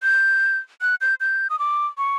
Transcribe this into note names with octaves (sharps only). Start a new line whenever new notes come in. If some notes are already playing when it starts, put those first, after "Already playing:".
G6
F#6
G6
G6
D#6
D6
C#6